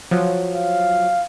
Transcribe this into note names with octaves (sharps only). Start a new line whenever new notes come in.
F3 F#3
F5